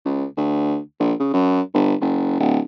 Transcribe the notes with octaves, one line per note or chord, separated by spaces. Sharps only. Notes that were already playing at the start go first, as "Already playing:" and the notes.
C#2
D2
A#1
C#3
F#2
G1
F#1
D1